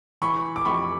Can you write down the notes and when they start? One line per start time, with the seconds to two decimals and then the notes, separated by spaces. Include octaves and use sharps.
0.22 E3 B5 C#6
0.56 D6
0.65 F2 B5 C#6